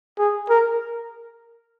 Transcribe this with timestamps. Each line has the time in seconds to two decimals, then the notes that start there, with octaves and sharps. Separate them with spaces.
0.19 G#4
0.50 A#4